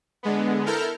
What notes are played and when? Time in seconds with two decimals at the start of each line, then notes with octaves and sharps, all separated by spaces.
0.23 D3 G#3 B3
0.66 E4 A4 A#4 F6 G6